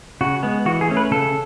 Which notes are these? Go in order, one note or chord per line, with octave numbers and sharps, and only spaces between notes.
C#3 F#4
G#3 B3
E3 F#4
G#4
A3 C#4
B4
C#3 A4